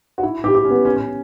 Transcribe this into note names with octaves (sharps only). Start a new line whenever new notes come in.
F#4
E4
G4
G4
C#4
B3
C#4
C#4